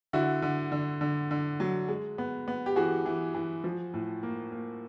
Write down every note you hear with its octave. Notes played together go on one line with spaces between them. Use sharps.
D3 E4 F#4
D3
D3
D3
D3
F#3
G#3
B3
B3
G4
E3 F#4 G#4
E3
E3
F3
A2
A#3
A#3